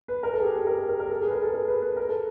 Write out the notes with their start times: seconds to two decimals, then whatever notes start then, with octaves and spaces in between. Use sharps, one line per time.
0.08 B4
0.23 A#4
0.33 A4
0.40 G#4
0.44 G4
0.56 A4
0.66 A#4
0.77 A4
0.89 A#4
0.99 A#4
1.10 A4
1.21 G#4
1.27 B4
1.32 A#4
1.43 A4
1.54 A#4
1.68 B4
1.82 B4
1.96 A#4
2.09 A4